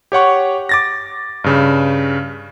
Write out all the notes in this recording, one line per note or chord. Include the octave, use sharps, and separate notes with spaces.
G4 C#5 F#5 C#6
D6 A6 A#6
G2 C#3